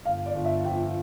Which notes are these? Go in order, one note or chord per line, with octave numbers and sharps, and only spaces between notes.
G1 F5
D5
G1
E5
F2 G5